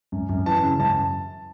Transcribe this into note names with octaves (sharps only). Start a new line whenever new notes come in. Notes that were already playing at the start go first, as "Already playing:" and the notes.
F#2
F#2
E3 A5
C#3
F#2 A5